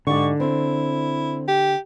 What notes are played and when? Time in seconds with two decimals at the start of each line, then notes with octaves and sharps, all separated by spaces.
0.07 G#2 D3 G4 D5 C#6
0.40 C4 E4
1.48 G4